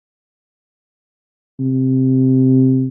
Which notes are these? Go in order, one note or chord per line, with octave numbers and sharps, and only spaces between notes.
C3